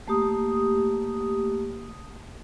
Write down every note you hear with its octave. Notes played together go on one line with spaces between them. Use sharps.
A3 A#3 G4 D#6